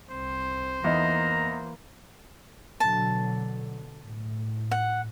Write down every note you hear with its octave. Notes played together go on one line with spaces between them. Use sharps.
C2 C4 C5
E2 E3 A#3 D#4 A#5
B2 D3 F#3 A5
A2
F#5